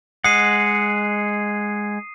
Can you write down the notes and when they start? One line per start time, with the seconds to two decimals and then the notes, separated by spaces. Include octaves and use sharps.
0.24 G#3 F#5 D#6 C7 D#7